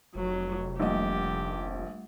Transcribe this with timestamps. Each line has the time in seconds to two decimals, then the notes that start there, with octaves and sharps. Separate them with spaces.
0.15 F1 F#3
0.79 A#1 G3 A3 G4 D#5 F#5